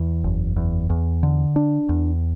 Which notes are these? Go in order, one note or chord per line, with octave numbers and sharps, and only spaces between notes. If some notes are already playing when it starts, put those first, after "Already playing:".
Already playing: E2
F#1
E2
E2
D3
D4
E2